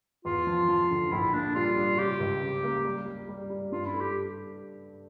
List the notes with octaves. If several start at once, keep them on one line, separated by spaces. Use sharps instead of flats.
E2 F4
F3
F3
D3
A#1 E4
A#2 D4
G3 F4
G3
C#3 G4
C#2
C#3
A#3
G3
G3
G3
G3
G2 F4
E4
A3
G4